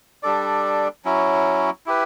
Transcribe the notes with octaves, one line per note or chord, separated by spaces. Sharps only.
G3 D4 A4 D5
F#3 C#4 E4
E4 G4 B4